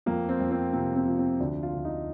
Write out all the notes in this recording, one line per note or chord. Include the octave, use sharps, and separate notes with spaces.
F2 A#3
C4
F2
C4
C3 A#3
C4
F3
C4
D2 D4
F4
D2
D#4